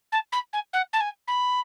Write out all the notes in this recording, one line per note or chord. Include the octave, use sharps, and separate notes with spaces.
A5
B5
G#5
F#5
A5
G#5
B5